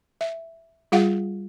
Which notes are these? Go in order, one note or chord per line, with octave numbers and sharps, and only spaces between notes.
E5
G3 F4 G#4 F5 F#5